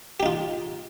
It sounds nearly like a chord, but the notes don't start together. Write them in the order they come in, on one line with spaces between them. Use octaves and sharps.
G4 D#4 F4